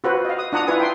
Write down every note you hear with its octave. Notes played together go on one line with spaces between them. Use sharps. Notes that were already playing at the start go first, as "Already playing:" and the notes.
F4 F#4 B4 C5
D#5 F5
D#6
D4 F4 F#5 A#5 D#6
E4 F4 B4 G#5 D#6
G5 C6